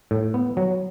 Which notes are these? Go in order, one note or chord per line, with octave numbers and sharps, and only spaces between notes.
A2
B3
F#3